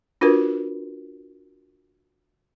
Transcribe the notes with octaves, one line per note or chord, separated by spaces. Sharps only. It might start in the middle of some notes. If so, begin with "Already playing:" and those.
D4 F4 F#4 A#4 B4